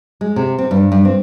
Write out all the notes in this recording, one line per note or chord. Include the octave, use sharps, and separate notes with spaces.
G#3
C3
C4
G2
G2
C4